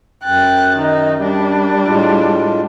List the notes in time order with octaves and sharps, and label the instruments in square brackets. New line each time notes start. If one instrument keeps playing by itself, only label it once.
[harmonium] F#2 [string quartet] G5 F#6 A6
[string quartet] D#3 D#4
G3 D4
[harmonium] A2 G#3 F4